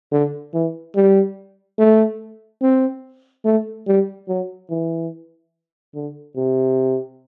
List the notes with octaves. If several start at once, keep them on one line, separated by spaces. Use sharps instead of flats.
D3
E3
G3
A3
C4
A3
G3
F#3
E3
D3
C3